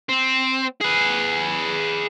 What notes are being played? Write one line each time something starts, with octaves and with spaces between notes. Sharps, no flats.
C4
G#4 B4